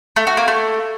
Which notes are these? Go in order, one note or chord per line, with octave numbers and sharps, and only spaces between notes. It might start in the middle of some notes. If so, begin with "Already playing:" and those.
A3
F#4
A#3
A3